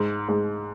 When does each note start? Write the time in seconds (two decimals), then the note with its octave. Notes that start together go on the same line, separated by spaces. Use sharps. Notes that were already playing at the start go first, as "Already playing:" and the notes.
Already playing: G#2
0.28 G#2